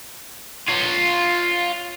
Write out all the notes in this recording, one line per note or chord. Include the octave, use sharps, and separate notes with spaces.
F4 C#5